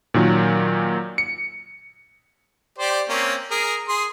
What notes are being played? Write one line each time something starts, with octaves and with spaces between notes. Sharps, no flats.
A#2 D#3 F#3
C#7
G4 C5 D5
A#3 C4 C#4
G#4 A#4
G#4 C6